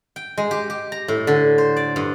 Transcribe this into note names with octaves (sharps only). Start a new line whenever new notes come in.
G5
G#3
G4
G4
A#5
A2
D3
C5
D5
G2